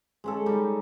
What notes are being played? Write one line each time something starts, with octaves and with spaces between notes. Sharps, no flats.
G#3 C#4 A4
G3 D#4